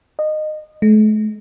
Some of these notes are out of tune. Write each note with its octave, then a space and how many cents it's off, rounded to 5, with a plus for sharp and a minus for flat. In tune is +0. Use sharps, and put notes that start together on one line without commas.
D#5 -20
A3 -45